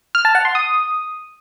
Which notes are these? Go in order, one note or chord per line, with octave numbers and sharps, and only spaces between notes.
F6
A5
F#5
C6
D#6